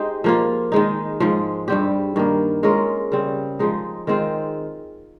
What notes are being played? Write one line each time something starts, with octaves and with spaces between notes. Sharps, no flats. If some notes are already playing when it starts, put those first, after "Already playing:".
Already playing: G#3 D#4 G4 C5
F3 A#3 F4
D#3 G#3 D#4
G#2 F3 G#3
G2 G3 C4 G4
G2 D#3 A#3
G#3 C#4 F4 A#4
C#3 G3 C4
F3 G#3 D#4
D#3 G#3 C4 F4